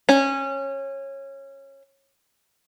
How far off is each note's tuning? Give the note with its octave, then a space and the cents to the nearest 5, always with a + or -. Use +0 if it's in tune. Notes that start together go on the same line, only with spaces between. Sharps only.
C#4 -20